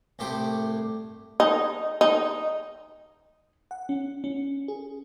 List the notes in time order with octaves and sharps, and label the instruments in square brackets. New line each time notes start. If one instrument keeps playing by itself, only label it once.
[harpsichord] C2 A2 A3 G4 C5 D6
[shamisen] D#4
D#4
[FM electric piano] F#5
C#4
C#4
G#4